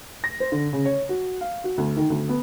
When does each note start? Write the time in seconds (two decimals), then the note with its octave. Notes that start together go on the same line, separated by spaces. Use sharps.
0.24 A#6
0.40 C5
0.52 D3
0.73 C#3
0.85 C#5
1.09 F#4
1.41 F5
1.64 F#4
1.78 D2
1.97 D#3
2.10 D2
2.29 B3